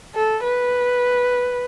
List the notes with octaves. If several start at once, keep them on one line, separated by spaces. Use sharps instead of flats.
A4
B4